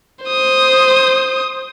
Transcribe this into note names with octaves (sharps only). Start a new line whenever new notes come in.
C5 D#6